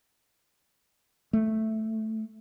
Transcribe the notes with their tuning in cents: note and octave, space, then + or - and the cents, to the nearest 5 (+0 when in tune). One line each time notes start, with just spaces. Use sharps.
A3 +0